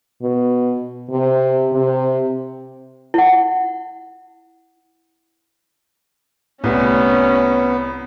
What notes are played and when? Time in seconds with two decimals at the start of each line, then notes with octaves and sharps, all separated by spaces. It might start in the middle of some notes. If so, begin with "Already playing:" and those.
0.22 B2
1.10 C3
1.73 C3
3.14 E4 F#5
6.64 C2 A2 G3 B3 C#4